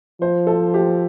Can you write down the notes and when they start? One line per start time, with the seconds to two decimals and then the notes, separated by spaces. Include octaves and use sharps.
0.21 F3 C5
0.47 A4
0.74 G4